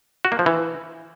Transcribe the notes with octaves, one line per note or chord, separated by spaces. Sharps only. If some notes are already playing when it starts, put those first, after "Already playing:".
F#4
A#3
F3
E3